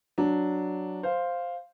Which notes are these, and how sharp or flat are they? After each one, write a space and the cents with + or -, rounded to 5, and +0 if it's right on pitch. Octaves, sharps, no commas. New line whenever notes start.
F#3 +0 D4 +0
C5 +0 F5 +0